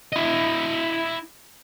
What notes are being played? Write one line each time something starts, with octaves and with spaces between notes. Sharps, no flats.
E4 D#5